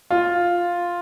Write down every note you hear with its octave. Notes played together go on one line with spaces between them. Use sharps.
F4